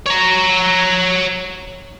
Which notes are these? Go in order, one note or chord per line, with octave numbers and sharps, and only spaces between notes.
C#5 A#5